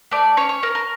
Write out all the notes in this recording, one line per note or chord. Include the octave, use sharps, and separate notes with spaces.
A3 D5
C#4 C#5
C#5
C#4 A#4
A#4